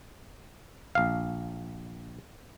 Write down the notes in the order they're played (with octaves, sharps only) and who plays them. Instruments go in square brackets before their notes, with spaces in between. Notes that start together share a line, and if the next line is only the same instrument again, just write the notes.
[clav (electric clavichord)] A#1 F5